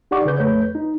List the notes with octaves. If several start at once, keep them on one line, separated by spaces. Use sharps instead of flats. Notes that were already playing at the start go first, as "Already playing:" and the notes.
D#4 G4 D5 F#5 C#6 D6
C#3 G#4 B4 G6
F2 A3 B4 C#5 G6
D#4